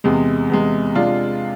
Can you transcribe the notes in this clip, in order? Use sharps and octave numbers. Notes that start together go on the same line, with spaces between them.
E2 C3 G#3
E2 C3 G#3
C3 G#3 D4 F4